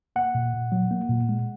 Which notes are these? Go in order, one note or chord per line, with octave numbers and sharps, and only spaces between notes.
A#3 F#5
A#2
A#2
F#3
A#3
A#2
G#3